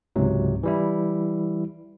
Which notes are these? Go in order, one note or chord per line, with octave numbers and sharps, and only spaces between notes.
C#2 G#2 C3 F#3
E3 G3 E4